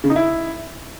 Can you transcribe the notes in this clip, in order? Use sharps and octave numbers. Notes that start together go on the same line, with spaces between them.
C#3
D#4
E4